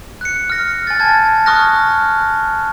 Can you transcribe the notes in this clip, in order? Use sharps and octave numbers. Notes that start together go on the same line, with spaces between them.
F#6 C#7
F6 A#6
G#5 A6
A5 G#6 A6
C#6 D#6 F6 F#6 A#6